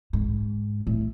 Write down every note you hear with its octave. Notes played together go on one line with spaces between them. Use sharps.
G#2
A2